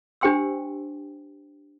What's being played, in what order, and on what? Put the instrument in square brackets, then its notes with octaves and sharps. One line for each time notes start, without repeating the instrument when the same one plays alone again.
[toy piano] D4 G4 C5 G5 C6 E6